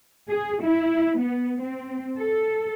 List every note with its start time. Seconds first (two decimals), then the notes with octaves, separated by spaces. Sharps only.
0.29 G#4
0.63 E4
1.19 B3
1.61 C4
2.18 A4